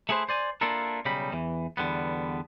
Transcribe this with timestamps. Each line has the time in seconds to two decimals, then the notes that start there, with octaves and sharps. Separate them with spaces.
0.09 A3 E4 G#4 B4 C5
0.29 C5 D5 G#5
0.61 A#3 D4 E4 F4 A4 A#4
1.05 B1 C#3 G3 D#4 B5
1.33 E2 E3
1.77 E2 D3 G3 B3